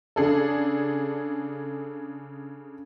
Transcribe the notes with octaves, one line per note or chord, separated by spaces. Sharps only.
C#3 D4 G#4 A4